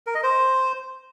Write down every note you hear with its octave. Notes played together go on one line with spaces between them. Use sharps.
A#4
D#5
C5